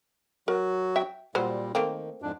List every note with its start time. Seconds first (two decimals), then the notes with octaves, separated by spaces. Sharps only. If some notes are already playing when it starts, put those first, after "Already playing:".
0.48 F#3 F#4 A#4
0.96 E5 G5
1.35 A#2 F#3 G3 C5
1.75 D#3 A3 A#3 C4
2.22 F2 G#2 D4